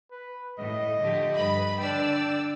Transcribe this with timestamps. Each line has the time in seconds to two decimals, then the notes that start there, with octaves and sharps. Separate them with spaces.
0.11 B4
0.59 A2 D#5
1.01 D3 F3 A3 G4
1.33 G2 B4 B5
1.78 D3 D4 D5 G5 E6